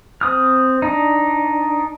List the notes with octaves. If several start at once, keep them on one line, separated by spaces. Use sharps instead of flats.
C4 D#6 F6
D4 D#4